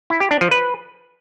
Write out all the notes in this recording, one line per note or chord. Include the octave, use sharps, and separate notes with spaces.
E4
G4
D4
F3
B4